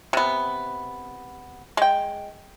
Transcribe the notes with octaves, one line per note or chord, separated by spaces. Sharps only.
C3 B3
G#3 G5